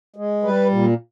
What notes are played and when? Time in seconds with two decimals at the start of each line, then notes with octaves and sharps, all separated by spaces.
0.16 G#3
0.43 G3 B4
0.71 A#2